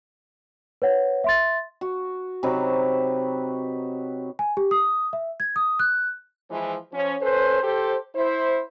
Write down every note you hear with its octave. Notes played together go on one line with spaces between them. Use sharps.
B4 C#5 F#5
E5 C6 A6
F#4
C3 F#3 D#4 B4
G#5
G4
D#6
E5
G#6
D#6
F#6
E3 F3 G#3 E4
F3 C#4
C#4 A4 B4 C5
G4 A4 C5
E4 C5